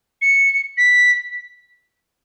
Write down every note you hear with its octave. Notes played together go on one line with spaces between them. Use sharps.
C#7
B6